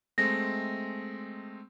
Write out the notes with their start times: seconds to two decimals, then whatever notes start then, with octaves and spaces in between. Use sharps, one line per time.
0.18 G#3 A3 C4 A#6